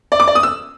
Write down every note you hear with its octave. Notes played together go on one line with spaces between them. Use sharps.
D5
D6
D5
D#6
E6